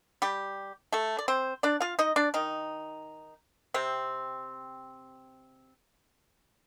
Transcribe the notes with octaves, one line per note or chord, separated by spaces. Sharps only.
G3 G4
A3 A4
D5
C4 C5
D4 D5
F4 F5
D#4 D#5
D4 D5
D#3 D#4
C3 C4